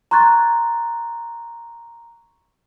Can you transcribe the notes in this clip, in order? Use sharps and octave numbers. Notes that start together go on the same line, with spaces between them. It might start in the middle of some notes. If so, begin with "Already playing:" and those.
A#5 C6 C#6 F#6 G#6 A6